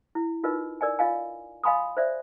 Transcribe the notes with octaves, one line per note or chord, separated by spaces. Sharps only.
E4
D#4 F4 A#4 B4 D#5
A#4 D5 D#5 G#5
F4 D#5 F5 G#5
D#5 F5 G#5 B5 C6 D#6
C5 D5 E5